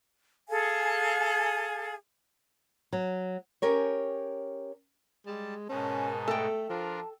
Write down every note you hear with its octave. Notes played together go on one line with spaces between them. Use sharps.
G#4 A4 F5 G#5
F#3
C#4 G4 A#4 C#5
G3 G#3 A5
G#2 B2 C#4 D#4 A#4 G#5 A5
A3 A4 G5
F3 D4 F4 A#4 A5